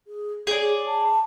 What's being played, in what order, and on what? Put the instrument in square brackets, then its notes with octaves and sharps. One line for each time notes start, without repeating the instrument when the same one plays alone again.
[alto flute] G#4
[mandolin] G#4 D5 [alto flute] C#5
[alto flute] A5